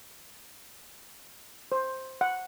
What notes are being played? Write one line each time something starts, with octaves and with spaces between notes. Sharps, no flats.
C5
F#5